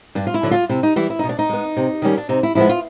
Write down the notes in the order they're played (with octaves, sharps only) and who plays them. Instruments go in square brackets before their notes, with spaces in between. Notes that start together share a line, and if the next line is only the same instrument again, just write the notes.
[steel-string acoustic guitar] G2 D4
F4
E4
D3 F#3
F4
C3 E4
D#4
E3 G3 E4
E4
B2 D#4
D4
D#4
G#3 B3
C3
D#3 G3 A#3 C#4
D4
C3 D#4
E4
F3 G#3 B3 E4
F4